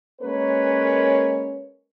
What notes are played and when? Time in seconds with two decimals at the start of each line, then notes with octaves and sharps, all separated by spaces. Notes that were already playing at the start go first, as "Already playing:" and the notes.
0.21 G#3 A#3 C#4 A#4 B4 C#5